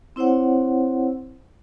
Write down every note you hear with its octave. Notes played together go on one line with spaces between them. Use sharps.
C4 E4 C5 C#5 F#5